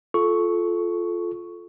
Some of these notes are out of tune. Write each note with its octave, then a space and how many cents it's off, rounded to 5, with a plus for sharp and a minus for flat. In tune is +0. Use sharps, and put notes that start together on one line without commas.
F4 +0 A4 -20 C#6 +0